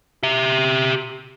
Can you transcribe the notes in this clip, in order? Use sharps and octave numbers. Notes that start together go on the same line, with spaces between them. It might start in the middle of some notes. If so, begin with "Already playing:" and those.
G4 E5